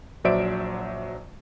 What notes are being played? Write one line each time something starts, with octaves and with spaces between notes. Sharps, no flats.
A#1 F#3 C5 D5 E5 D7